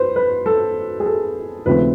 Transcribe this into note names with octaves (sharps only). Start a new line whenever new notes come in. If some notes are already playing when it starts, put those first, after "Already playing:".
Already playing: B4 C5
B4
A4
G#4
A4
D#2 C#3 F3 A3 C4 B4